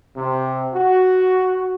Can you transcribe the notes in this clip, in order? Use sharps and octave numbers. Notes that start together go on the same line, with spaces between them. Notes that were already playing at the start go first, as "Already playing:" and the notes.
C3
F#4